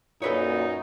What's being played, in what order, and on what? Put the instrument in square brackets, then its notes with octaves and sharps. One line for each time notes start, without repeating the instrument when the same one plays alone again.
[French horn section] F#2 [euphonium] A#2 [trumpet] D#4 [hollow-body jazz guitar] A4 B4 C#5